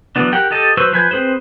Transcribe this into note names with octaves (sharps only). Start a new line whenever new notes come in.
E3 F#3 B3 D4
G4 A#4 F#5 G5
G4 A4 D#5 A5
F#3 B4 C5 C#6 E6
F3 B4 G#5 G6
C4 E4 G#4 B4 C5